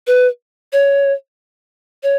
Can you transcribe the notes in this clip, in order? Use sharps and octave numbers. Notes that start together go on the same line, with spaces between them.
B4
C#5
C#5